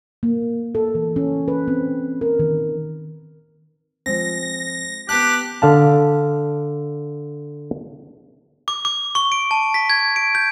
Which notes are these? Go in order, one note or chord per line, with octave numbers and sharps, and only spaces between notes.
A#3
A4
E3
C#4
B4
C4
A#4
D#3
F3 G#3 C4 A#6
B3 G4 A5 F#6
D3 F5 A5
D6
D6
C#6
D7
A5
B6
G#6
D7
G6